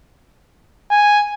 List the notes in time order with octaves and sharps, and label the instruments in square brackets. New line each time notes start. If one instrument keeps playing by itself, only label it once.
[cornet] G#5